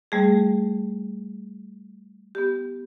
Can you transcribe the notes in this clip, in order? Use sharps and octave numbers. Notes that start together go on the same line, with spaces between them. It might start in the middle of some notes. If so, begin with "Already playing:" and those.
G3 A3 G#4
B3 G4